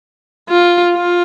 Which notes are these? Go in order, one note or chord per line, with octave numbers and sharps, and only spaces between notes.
F4
F4